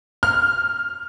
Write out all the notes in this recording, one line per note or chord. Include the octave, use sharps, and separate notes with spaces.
F6